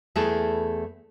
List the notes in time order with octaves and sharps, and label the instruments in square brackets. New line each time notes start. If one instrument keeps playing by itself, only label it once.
[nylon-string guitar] E2 A3 E4 G#4 A4